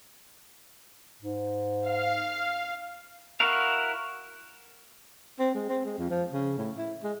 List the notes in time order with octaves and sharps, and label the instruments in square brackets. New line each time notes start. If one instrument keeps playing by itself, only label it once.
[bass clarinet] G#2
[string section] F5
[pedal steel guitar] E4 F#4 A#4 F5
[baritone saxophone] C4
G#3
C4
G#3
F2
F3
C#3
A2
E4
G#3